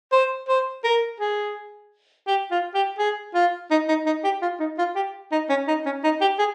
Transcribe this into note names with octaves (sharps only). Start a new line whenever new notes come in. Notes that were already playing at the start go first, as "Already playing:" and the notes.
C5
C5
A#4
G#4
G4
F4
G4
G#4
F4
D#4
D#4
D#4
G4
F4
D#4
F4
G4
D#4
C#4
D#4
C#4
D#4
G4
G#4